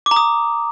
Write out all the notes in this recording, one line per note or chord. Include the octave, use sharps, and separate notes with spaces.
D6
A#5
D#6